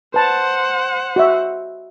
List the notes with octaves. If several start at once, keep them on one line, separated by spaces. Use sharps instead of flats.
B4 C5 F#5 A5
F#4 D#5 E5